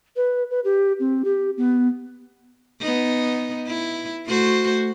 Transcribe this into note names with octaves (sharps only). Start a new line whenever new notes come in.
B4
B4
G4
C4
G4
B3
B3 D#4
E4
A3 F#4 C5